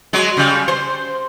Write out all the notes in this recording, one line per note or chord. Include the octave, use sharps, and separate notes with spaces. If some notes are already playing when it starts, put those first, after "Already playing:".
F#3 G#3
C#3 G3
C5